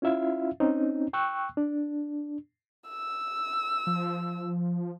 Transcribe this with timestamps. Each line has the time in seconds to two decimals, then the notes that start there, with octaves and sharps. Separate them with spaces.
0.02 C#4 E4 F4 E5 F5
0.60 C4 C#4 D#4
1.13 G5 C#6 E6 F#6
1.57 D4
2.89 E6
3.87 F3